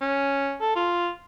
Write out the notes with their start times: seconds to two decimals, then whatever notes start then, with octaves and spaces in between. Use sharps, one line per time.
0.01 C#4
0.60 A4
0.76 F4